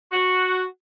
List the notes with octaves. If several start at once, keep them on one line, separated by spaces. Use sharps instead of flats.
F#4